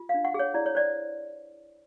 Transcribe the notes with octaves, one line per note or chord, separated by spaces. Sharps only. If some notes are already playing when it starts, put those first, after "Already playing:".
Already playing: F4
F5
D4
F#5
G#4
C#5
E4 D5
C#5
C5 D5